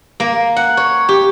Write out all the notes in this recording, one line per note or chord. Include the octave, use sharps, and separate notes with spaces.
A#3
F#5
C#5
G4